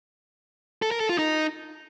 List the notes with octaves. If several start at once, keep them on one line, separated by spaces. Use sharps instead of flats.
A4
A#4
A4
F4
D#4